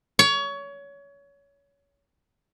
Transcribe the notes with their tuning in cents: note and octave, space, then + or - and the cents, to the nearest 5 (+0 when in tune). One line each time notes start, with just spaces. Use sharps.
C#5 +25